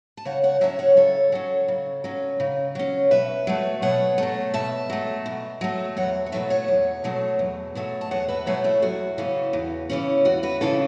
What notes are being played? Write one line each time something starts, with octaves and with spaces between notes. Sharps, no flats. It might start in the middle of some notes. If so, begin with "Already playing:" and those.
A5
C#3 C#5 F#5
C#5 F#5
F#3 C#4 E5 A5
C#5 F#5
C#3 A4 C#5
F#3 C#4
C#3
F#3 C#4
C#3
F#3 C#4
B2 B4 E5
F#3 A3
B2 C#5 F#5
F#3 A3
B2 E5 A5
F#3 A3
B2
F#3 A3
E2 C#5 F#5
C#5
B2 F#3 A3 B4 E5
C#5 F#5
E2
B2 F#3 A3
E2
B2 F#3 A3
A5
E2 C#5 F#5
B4 E5
B2 F#3 A3 C#5 F#5
E4 A4
E2 F#4
C#3 E3 C#4
E2
C#3 E3 C#4
E2 F#4
F#4 B4
C#3 E3 C#4 E4 A4